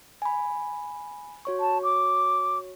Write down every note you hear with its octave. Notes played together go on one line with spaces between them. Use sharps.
G#5 B5
F#4 C#5 C#6
A5
D6